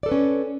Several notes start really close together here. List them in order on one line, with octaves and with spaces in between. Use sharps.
D5 A4 B4 C#4